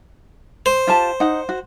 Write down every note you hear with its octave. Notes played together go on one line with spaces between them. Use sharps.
C5
F4 G4 A5
D#4 F#5
F#4